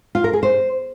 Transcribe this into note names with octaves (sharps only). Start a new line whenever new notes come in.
F4
A#4
G#4
C5